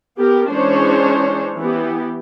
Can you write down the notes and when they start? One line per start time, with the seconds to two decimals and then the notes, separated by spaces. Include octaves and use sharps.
0.18 B3 G4 A#4
0.50 E3 G#3 C#4 D4 C5 C#5
1.56 E3 B3 G4